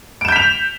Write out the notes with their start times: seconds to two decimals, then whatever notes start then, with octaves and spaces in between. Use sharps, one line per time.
0.21 D7
0.25 E7
0.29 G6
0.32 B6
0.36 F7